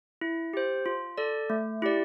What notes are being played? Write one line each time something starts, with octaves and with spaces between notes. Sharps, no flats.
E4
G4 C5
F4
A4 D5
A3
E4 G4 D5